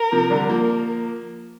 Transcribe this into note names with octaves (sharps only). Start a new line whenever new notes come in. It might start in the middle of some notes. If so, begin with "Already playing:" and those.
Already playing: A#4
C3 F3
D3 G3
F3 A#3